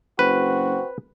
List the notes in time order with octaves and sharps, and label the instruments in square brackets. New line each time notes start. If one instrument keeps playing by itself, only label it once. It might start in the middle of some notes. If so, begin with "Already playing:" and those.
[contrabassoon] F#1 [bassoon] C4 [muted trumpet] F#4 [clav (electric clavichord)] B4